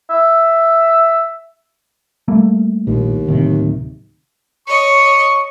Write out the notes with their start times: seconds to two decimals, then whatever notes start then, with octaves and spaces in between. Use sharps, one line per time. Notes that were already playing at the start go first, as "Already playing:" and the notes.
0.10 E5
2.28 G3 A3 A#3
2.87 A#1 D#2
3.28 D1 C3 D#3
4.67 C#5 D#5 C#6